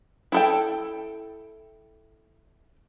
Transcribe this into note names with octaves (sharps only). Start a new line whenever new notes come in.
E4 A4 G5